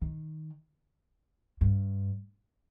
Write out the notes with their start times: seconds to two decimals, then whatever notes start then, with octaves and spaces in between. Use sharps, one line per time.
0.02 D#3
1.61 G2